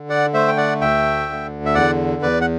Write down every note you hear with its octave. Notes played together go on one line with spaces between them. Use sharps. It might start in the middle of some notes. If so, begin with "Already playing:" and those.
Already playing: D3
D5 F#5
A3 C5 E5
G5
D5 F#5
D2 E5 G5
D3
E5
E2 D5 F#5
E2 B4 D5
F#5